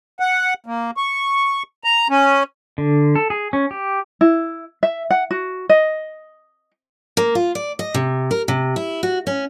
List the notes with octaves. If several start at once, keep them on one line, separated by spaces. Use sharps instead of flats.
F#5
A#3
C#6
A#5
C#4
D3
A4
G#4
C#4
G4
E4
E5
F#5
F#4
D#5
A#3
F4
D5
D#5
C3
A#4
C3
E4
F#4
C#4